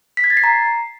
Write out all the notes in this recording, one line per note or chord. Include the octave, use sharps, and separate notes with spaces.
B6
G#6
A6
C7
A#5